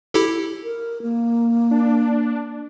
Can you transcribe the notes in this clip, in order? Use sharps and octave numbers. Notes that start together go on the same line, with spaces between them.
E4 G4 A4
A#4
A#3
D4